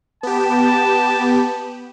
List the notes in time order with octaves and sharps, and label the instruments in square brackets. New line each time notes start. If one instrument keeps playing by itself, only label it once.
[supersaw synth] B3 G4 [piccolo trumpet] A5